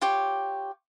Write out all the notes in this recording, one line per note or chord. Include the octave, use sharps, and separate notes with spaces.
F4 G4 C#5